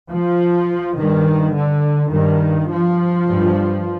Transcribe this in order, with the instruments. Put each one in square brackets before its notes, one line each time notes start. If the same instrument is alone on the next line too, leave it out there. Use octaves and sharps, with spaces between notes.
[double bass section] F3
G2 D#3
D3
G2 D#3
F3
G2